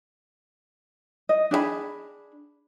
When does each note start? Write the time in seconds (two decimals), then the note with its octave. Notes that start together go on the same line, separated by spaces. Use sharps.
1.29 D#5
1.51 D4 G#4 E5 B5